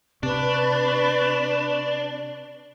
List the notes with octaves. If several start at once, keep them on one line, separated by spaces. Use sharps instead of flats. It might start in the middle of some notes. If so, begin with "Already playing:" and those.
C3 D4 B4 C#6